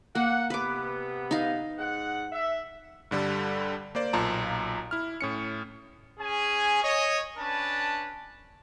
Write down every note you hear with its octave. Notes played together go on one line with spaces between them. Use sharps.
A#3 F#5
C3 B3 B4 D6
D#4 F5
G#2 F#5
E5
G2 D3 G3 A4
A#3 C5 D5
B1 A#2 F4 A5 A#5
E4 F6
A2 C#4 C#7
C#4 G#4 G#5
C#5 D#5
C#4 D4 B4 A5